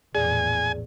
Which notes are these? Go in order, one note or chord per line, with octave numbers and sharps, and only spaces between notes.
A#1 E2 A2 G#4 D5 G#5